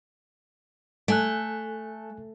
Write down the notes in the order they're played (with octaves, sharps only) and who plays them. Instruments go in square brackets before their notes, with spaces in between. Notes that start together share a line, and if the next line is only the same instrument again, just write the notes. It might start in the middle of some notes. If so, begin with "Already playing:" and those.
[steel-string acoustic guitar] A3 [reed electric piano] A4 G#5 F#6